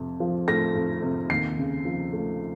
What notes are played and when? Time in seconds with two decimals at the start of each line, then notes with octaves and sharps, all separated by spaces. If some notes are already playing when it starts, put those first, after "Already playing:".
Already playing: F2 C3
0.20 F3
0.48 A3 A#6
0.75 F2
1.03 C3
1.30 D#2 C7
1.58 C#3
1.85 F3
2.13 A3